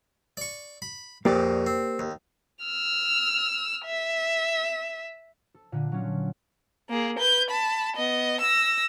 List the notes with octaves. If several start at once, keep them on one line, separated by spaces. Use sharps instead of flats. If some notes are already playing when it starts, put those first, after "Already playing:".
D5 C#6
B5
A#1 F2 A#2 A#3 G4 D5
C4
D#2
E6 F6
E5
A4
A#2 D3
F#3 C#4 F4
A#3 G#4
B4 G6
A5 B5
B3 D#5
E6 A#6